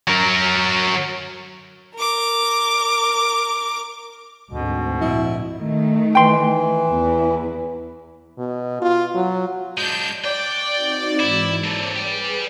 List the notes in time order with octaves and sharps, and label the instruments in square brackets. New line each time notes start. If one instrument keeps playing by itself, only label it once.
[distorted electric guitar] F#3 A#4
[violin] A#4 D6
[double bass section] D2 G#2 C4 [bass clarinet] B2
[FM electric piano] A#2 F3 [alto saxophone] E4
[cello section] D#3 A3
[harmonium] E3 [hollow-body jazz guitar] G5 C6
[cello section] E2 E4
[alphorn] B2
F4
F#3
[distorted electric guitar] G#3 D4 [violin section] G6
[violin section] D5 [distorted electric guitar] G5 [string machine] C#6 F#6
[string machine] C4 D#4 F#4
[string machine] G#2 E3 [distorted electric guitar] E4
[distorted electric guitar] A#3 A4 [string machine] C5 C#5
[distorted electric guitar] G4 D5 [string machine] G#4 B4 G#5